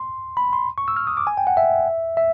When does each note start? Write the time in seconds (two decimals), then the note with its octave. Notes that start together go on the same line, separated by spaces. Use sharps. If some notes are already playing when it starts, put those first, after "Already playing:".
Already playing: C6
0.37 B5
0.53 C6
0.78 C#6
0.88 E6
0.97 F6
1.07 D#6
1.17 D6
1.27 G#5
1.37 G5
1.47 F#5
1.57 E5
2.17 E5